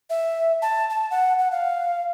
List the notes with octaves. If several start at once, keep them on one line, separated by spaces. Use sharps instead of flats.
E5
A5
A5
F#5
F#5
F5